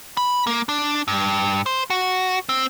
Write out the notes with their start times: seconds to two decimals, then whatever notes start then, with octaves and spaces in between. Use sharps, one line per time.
0.17 B5
0.47 A#3
0.69 D4
1.08 G2
1.66 C5
1.90 F#4
2.49 C4